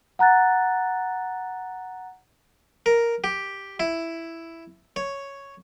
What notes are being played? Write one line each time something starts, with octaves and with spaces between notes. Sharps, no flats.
F#5 A#5 F#6 A6
A#4
G4
E4
C#5